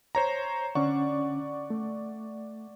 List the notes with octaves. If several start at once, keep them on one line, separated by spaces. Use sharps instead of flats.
C5 C#5 A#5
D3 C#4 D5 F#5 C#6
A3